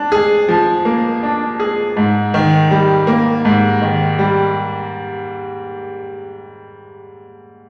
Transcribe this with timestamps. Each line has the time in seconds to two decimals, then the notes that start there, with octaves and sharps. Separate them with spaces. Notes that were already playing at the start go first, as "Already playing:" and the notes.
Already playing: D4
0.12 G#4
0.49 F3
0.85 A#3
1.23 D4
1.60 G#4
1.97 G#2
2.34 D#3
2.71 G3
3.07 A#3
3.45 G#2
3.82 D#3
4.19 G3